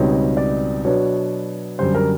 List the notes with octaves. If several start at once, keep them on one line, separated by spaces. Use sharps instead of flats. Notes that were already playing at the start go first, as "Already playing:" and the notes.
Already playing: C#2 B2 G3 C4 D#4 C#5
D5
B2 F#3 B3 D4 C#5
F#2 D3 G3 C5
A#4